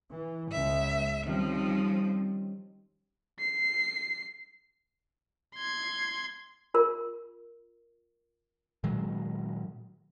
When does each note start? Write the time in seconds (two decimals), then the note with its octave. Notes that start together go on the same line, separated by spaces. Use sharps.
0.11 E3
0.52 C#2 E5
1.27 D#3 F3 G3 C4 C#4
3.40 C7
5.56 C6 G#6
6.74 F4 A#4
8.84 A#2 D#3 F#3 G#3